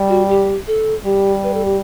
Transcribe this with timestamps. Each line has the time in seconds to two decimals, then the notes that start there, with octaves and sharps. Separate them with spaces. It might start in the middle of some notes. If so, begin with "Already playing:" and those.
Already playing: G3
0.09 F#4
0.29 G4
0.67 A4
1.05 G3 G4
1.43 B4
1.54 A4
1.65 G4